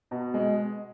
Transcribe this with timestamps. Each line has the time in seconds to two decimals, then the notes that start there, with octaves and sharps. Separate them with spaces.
0.11 B2
0.34 G#3